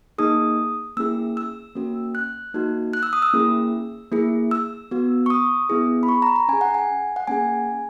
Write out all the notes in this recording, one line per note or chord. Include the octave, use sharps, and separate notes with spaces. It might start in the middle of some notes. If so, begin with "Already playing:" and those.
A#3 D#4 G#4 D#6
A#3 C#4 E4 G#4 E6
E6
A#3 C#4 F#4
F#6
A#3 D#4 F#4
F#6
E6
D#6
E6
A#3 C#4 E4 G#4
A#3 E4 G#4
E6
B3 F#4
C#6
D#6
B3 E4 G#4
B5
C#6
A#5
A#5
C#4 G#4 G#5
F#5
G#5
F#5
A#3 C#4 G#4 G#5